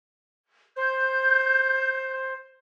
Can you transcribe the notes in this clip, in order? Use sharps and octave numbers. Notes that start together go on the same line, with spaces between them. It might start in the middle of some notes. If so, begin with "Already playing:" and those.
C5 G6